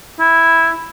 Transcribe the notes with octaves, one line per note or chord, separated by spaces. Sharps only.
E4